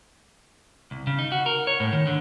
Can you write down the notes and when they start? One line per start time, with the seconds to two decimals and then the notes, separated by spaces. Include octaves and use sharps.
0.91 C2
1.07 C#3
1.19 D#4
1.32 F#4
1.46 A#4
1.67 C#5
1.80 A2
1.93 D#3
2.07 D3